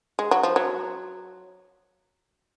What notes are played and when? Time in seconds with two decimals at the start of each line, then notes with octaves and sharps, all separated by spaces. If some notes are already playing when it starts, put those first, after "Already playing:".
0.19 G#3
0.31 F#3
0.43 F3
0.56 F#3